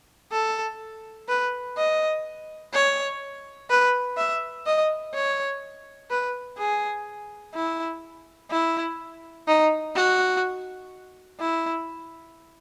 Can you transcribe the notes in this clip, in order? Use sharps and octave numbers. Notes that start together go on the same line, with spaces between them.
A4
B4
D#5
C#5
B4
E5
D#5
C#5
B4
G#4
E4
E4
D#4
F#4
E4